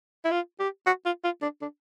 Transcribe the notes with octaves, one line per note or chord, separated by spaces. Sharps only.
E4
F4
G4
F#4
F4
F4
D4
D4